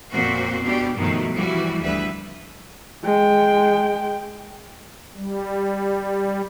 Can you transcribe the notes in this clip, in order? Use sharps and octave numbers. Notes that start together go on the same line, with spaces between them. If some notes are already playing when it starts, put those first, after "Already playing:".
F2 A#2 C4 F#4 C5
B2 D4 G4
G2 B2 D#3 F3 F#3 A3
E3 F3 G3 E4 F#4
D2 G3 B4 E5
G#3 G5
G3